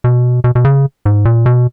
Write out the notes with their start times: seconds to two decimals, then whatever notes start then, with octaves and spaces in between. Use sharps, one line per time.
0.04 B2
0.44 B2
0.55 B2
0.65 C#3
1.05 G#2
1.25 A#2
1.46 B2